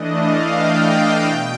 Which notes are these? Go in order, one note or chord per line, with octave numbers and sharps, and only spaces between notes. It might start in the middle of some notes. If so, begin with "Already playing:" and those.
Already playing: E3 A3 D4 D#5
F5
G5
B2